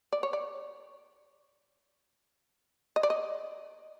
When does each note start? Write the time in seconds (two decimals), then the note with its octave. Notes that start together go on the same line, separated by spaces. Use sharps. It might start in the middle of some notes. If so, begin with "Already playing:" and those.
0.13 D5
0.23 C#5
0.33 D5
2.96 D#5
3.03 D5
3.10 D#5